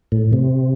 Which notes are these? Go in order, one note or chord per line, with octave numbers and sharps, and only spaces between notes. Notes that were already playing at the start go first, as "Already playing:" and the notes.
A2
C3